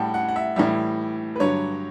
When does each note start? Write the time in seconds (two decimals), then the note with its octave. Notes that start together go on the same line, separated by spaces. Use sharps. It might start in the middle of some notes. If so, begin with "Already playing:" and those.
Already playing: A2 G3 F#5 G5 A5
0.14 F#5
0.28 F#5
0.36 E5
0.56 A2 E3 G3 E5
1.36 B4
1.40 G2 D3 F#3 C#5